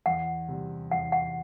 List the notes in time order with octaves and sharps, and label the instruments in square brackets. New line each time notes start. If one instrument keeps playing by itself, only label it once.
[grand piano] E2 [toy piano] F#5
[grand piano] C3 G3
[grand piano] E2 [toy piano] F#5
[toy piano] F#5